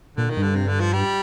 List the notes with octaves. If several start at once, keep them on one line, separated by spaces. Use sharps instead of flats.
A#2 D3
D#3
G2
D3
C3
D3
F3
G3